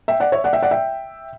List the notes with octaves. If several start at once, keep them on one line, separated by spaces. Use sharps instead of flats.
E5 G5
D5 F#5
C#5 E5
D5 F#5
E5 G5
D5 F#5
E5 G5